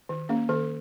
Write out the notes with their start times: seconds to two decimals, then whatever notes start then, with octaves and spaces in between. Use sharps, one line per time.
0.09 D#3
0.29 A#3 C#4
0.49 D#3 A4